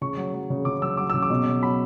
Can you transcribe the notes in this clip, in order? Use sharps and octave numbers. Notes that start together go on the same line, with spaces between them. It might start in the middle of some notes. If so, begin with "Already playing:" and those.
C#3 C#6
F#3
F#3
C#3
C#3 D6
F#3 E6
F#3 D6
C#3 E6
D6
B2
F#3
F#3 B5